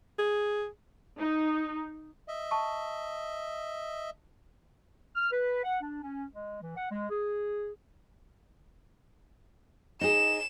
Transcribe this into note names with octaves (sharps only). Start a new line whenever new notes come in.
G#4
D#4
D#5 E5
A5 C#6
F6
B4
F#5
D4
C#4
G#3
E3
F#5
G#3
G#4
D#4 G#4 E7